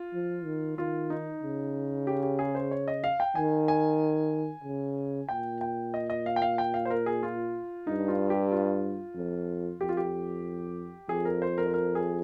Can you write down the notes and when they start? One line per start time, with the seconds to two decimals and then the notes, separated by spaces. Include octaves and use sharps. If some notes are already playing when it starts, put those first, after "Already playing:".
Already playing: F4
0.14 F3
0.45 D#3
0.77 D#3 F4
1.10 D#4
1.42 C#3
2.07 G4
2.23 G4
2.39 G#4
2.55 C5
2.71 C#5
2.88 D#5
3.04 F5
3.20 G5
3.35 D#3 G#5
3.68 G#5
4.64 C#3
5.29 A#2 G5
5.61 G5
5.94 D#5
6.10 D#5
6.26 F5
6.36 G5
6.42 F5
6.58 G5
6.74 F5
6.85 C5
6.90 A#4
7.06 G#4
7.23 F4
7.87 G2 D#4
8.08 F4
8.30 G4
8.52 F4
9.16 F2
9.81 F2 G4
9.89 F4
9.97 G4
11.09 F2 G#4
11.25 A#4
11.42 C5
11.58 A#4
11.66 C5
11.74 A#4
11.95 G#4